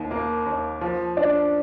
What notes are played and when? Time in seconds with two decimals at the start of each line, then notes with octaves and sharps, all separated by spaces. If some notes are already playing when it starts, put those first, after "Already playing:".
Already playing: D#2 D#3
0.11 A#3
0.46 D#2
0.81 F3
1.17 D4